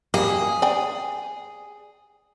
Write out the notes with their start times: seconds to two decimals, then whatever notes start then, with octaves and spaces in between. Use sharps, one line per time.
0.14 G3 A#3 G#4
0.62 D5 G5 G#5